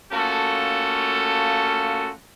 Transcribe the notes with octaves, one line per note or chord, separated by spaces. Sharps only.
A3 A#3 C#4 F4 F#4 A4